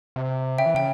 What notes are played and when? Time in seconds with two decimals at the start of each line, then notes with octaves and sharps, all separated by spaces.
0.16 C3
0.58 C#3 E5 G5
0.66 E3
0.75 C#3 G5